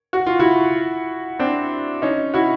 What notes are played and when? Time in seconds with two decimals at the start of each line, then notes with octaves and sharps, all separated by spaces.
0.13 F#4
0.27 F4
0.40 E4 F#4
1.39 C4 D4
2.02 C#4 D#4
2.34 E4 F#4